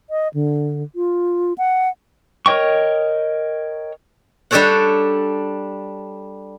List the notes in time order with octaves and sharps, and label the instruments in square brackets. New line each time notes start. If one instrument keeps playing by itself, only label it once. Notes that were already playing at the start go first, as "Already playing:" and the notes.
[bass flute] D#5
D3
F4
F#5
[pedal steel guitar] A#4 C#5 D#5 G5 C#6
[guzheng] G3 D4 G4 A4 C#5 F#5